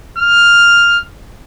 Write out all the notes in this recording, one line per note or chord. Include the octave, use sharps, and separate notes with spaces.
F6